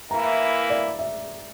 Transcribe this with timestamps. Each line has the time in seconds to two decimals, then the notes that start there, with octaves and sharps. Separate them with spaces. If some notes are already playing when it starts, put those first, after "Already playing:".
0.11 E3 A#3 E4 A#5
0.70 D5
0.99 E5